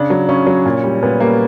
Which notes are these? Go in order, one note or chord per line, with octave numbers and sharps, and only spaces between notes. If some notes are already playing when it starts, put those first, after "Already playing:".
Already playing: C#3 D4
F#3
C#3 C#4
F#3
A#2
G3
A#2 B3
G3 A#3